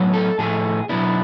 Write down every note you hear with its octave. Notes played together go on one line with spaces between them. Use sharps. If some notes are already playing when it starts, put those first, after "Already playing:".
Already playing: A2 F#3 B3
A4
A2 F3 A3 G#4
B2 F#3 B3 D4 E4